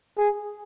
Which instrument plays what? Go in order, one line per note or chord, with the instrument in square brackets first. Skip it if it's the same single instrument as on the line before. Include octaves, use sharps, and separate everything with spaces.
[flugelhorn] G#4